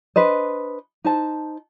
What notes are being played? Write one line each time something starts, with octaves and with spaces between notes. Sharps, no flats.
D4 B4 C5 D#5
D#4 C5 A5